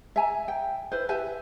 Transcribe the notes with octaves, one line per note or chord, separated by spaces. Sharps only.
E5 G#5 A#5
G5
E4 B4 C5
G4 B4 E5 G#5